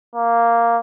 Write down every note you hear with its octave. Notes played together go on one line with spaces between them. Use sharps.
A#3